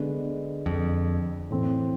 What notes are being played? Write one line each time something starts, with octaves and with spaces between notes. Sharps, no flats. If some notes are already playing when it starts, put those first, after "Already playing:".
Already playing: D3 G#3 B3
F2
A2 E3 A3 C4